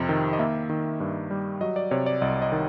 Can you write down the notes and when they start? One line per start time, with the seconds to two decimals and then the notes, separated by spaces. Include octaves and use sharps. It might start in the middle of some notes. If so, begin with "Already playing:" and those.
Already playing: F2 C3
0.09 D#3
0.33 D#5
0.39 A#3 E5
0.70 D#3
1.00 G2
1.31 G3
1.61 F#3 D#5
1.76 D5
1.91 C3 C#5
2.06 D5
2.21 C2 D#5
2.42 D#5
2.52 D#3